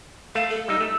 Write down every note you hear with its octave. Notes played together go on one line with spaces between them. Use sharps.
A3 F5
A4
G3 D#4 E6
A3